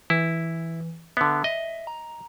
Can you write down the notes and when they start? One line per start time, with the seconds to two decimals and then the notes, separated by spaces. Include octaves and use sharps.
0.10 E3 E4
1.17 D3 B3 E5
1.44 D#5 E5
1.87 A#5